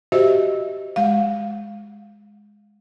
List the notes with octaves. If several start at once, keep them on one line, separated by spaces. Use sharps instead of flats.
F#4 G4 C5 D#5 E5
G#3 F5